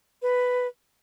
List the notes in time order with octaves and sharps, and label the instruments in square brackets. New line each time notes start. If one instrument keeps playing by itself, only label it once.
[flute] B4